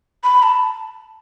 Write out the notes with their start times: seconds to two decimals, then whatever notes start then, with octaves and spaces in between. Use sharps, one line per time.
0.24 B5
0.43 A5